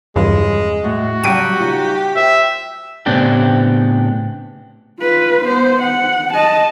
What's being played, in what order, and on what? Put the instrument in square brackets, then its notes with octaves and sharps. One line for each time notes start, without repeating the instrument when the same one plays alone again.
[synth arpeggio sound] E2 G2 [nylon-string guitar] C#3 F3 [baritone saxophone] G#3
[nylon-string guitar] A2 [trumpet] F#4
[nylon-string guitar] C#3 F#3 A5 [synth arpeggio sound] G3 D6 D#7 [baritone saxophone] G4
[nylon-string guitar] C#3 D#4 F4
[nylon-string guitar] C5 [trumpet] E5
[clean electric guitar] A2 C#3 B3 C4 D4 G4
[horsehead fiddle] F4 B4
B3 C5
F#5
D#5 A5